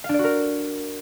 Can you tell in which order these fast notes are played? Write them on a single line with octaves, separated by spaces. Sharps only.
F5 D4 D5 F#4 A#4